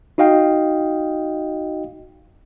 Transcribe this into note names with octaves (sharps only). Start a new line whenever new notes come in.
D#4 F#4 D#5 F5 G5